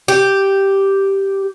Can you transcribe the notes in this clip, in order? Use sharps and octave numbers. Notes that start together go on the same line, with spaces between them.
G4